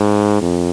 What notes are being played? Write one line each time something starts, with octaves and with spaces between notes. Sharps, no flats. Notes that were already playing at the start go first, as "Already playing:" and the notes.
Already playing: G#2
F2